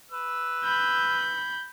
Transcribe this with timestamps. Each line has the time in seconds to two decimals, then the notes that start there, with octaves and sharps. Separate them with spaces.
0.11 B4 E6
0.64 B5 G6